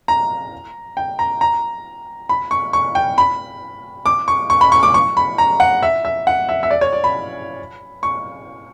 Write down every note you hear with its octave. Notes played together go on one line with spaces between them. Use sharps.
A#5
G5
A#5
A#5
B5
C#6
C#6
G5
B5
D6
C#6
C#6
B5
C#6
D6
C#6
B5
A#5
F#5
E5
E5
F#5
E5
E5
D5
C#5
D5
B5
C#6